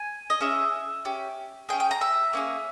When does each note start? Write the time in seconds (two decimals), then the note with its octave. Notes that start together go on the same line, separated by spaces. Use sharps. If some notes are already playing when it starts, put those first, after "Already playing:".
Already playing: G#5
0.30 D#5
0.41 C#4 E4 G#4 E5
1.05 C#4 G4
1.69 G#4 G5
1.73 C#4
1.80 G5
1.91 A#5
2.01 E5
2.33 A#3 C#4 G#4